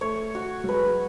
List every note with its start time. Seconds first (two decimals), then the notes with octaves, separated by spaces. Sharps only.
0.01 A3 C#5
0.35 F#4
0.64 F#3
0.68 G#3 B4